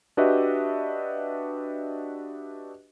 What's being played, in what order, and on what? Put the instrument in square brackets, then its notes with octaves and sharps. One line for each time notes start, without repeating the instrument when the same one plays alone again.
[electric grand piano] D4 F#4 G4 B4 D#5 E5